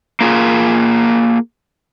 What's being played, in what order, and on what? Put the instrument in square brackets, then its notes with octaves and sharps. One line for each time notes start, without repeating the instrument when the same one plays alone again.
[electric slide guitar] A#3 F4 G#4